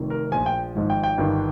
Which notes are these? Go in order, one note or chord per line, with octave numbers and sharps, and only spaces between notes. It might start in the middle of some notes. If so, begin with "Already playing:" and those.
Already playing: F1 F2 D#3
A#4
A#1 A#2 F3 G#5
G5
G#1 G#2 F3
G5
G5
G1 G2 D#3